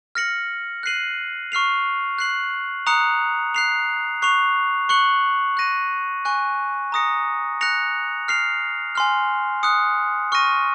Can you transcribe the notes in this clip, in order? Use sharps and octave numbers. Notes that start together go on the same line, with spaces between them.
F6 A#6 C#7 F#7
F#6 C7 D#7 F#7
C#6 F6 C7 F7
F#6 C7 F#7
A#5 D#6 F#6 C#7 F7
F#6 C7 F7
C#6 F#6 C7 F7
C#6 F#6 C#7 F#7
F#6 A#6 D#7
G#5 C#6 F#6
A#5 D#6 A#6 C#7
F#6 A#6 C#7 F7
F6 C7 F7
G#5 C6 F6
D#6 F#6 C#7
C#6 F6 A#6 D#7